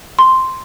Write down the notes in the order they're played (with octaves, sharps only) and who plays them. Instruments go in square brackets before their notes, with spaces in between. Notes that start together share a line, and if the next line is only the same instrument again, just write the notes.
[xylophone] C6